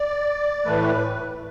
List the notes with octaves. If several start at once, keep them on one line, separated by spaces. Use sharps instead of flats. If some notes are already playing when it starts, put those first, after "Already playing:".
Already playing: D5
A2 E3 A3 B4